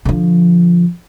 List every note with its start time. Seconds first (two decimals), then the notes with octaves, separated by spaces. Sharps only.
0.05 D3 F3